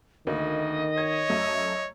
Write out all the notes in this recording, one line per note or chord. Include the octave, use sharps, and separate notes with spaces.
D2 D#3 A#3 D#5
C#5 G#6
F#2 A3